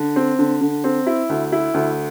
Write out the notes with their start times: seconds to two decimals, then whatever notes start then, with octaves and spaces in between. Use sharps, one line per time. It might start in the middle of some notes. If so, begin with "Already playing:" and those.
Already playing: D3
0.16 C4
0.39 D3
0.61 D3
0.84 C4
1.06 E4
1.29 D2
1.52 E4
1.74 D2